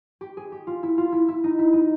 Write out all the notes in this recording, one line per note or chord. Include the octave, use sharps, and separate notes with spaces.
G4
G#4
G4
F4
E4
F4
E4
E4
D#4
E4
D#4